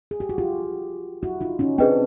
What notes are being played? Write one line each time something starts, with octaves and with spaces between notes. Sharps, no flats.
G#4
G4
F#4
F4 G4
E4 F#4
D#4 F4
C#4 D#4
C4 D4 G#4 B4 D#5 G5